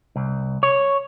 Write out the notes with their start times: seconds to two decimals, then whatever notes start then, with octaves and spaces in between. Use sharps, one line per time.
0.16 C2
0.63 C#5